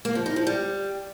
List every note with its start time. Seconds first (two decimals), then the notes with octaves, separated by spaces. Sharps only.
0.05 A#3
0.15 F3
0.26 D#4
0.36 F3
0.47 G3